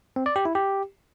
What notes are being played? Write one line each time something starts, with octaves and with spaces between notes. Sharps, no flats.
C4
D5
G4
E4
G4